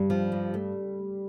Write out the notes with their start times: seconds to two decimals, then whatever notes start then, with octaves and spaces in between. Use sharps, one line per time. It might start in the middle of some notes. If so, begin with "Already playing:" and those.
Already playing: G2 G3
0.10 F3
0.32 G2
0.54 A3